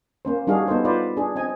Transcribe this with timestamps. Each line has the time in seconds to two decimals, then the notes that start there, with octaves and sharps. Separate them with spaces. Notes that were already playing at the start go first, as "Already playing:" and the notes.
0.25 A#3 C#4 C5
0.47 G3 D4 D#4 F#4 G#4 F5
0.68 B3 D#4 A4 C5
0.85 D#4 F4 B4 C5 D5
1.17 D4 G#4
1.36 C4 D#5 G#5